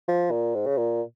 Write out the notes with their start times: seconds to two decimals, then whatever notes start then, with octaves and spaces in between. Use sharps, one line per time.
0.08 F3
0.31 A#2
0.55 G#2
0.66 C#3
0.77 A#2